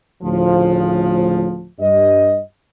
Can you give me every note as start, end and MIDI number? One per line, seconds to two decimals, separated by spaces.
0.22 1.66 38
0.22 1.66 45
0.22 1.66 49
0.22 1.66 53
1.80 2.39 43
1.80 2.39 75